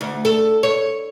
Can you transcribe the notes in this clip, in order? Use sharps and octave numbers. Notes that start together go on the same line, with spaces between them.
D2
A4
C#5